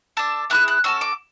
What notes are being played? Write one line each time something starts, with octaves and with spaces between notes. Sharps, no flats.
D4 A4 A5
A3 E4 G#4 F#6
F#6
C#4 F#4 A4 E6
D6